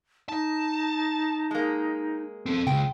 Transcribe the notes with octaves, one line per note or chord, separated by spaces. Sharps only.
D#4 A5
G#3 A#3
C4 A4
C#2 G5